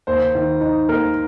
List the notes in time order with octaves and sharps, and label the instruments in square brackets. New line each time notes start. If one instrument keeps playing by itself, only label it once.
[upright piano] D#2 [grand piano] C5
[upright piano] D#3
D#4
[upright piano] A#3 [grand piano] A#4